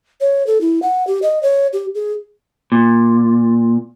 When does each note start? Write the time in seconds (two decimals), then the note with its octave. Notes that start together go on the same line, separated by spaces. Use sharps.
0.21 C#5
0.47 A4
0.61 E4
0.82 F#5
1.07 G4
1.22 D#5
1.43 C#5
1.73 G4
1.95 G#4
2.72 A#2